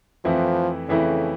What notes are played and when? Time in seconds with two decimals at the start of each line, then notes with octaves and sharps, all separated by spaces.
0.25 F2 E3 F3 A3 E4
0.89 F2 C#3 E3 A3 E4